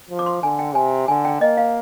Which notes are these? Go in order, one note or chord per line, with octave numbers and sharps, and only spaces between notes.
F3
D6
C6
D3 G#5
G5
C3 G#5
D3 G#5
G5
A#3 D#5
F5